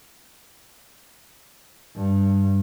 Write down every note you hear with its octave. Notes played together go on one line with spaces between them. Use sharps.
G2